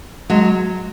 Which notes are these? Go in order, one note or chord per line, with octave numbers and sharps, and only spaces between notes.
F#3 G#3